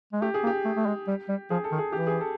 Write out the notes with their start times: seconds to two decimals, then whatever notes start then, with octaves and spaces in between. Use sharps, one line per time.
0.13 G#3
0.22 A3 G4
0.34 G#4
0.43 A#3
0.47 G4
0.65 A3
0.76 A3
0.86 G#3
1.08 G3
1.29 G3
1.50 F3 G#4
1.64 A4
1.72 D#3
1.78 G#4
1.92 E3 G4
2.07 G#4
2.21 A4